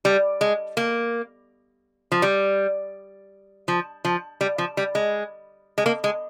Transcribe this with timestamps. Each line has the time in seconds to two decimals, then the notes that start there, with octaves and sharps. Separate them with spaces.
0.05 G3
0.41 G#3
0.77 A#3
2.12 F3
2.22 G3
3.68 F3
4.05 F3
4.41 G3
4.58 F3
4.77 G3
4.95 G#3
5.78 G#3
5.86 A#3
6.04 G#3